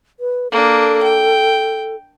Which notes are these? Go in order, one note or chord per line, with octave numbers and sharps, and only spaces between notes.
B4
A#3 D4 A4
G5